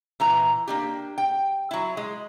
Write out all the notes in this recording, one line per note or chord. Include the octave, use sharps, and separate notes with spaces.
A#2 E3 A#5
A#3 D4 G4
G5
F#3 E4
G#3